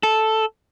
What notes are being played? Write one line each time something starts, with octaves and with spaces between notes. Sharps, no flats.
A4